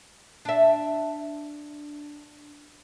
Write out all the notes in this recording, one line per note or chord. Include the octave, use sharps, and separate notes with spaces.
D4 E5